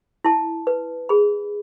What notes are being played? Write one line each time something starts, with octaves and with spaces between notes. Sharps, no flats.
E4 A5
B4
G#4 B5